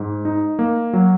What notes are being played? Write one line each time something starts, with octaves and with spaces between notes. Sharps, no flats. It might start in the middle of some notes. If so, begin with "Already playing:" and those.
Already playing: G#2
D#4
A#3
F#3